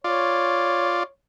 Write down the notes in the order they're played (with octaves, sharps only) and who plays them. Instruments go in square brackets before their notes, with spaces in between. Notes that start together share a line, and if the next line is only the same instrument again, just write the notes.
[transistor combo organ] F4 D5 [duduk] C#5